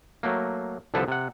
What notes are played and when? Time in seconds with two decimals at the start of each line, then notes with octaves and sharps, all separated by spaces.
0.23 F#3 A3 A#3
0.94 C2 D3 F3 A4 B4 A5
1.08 C3 F#5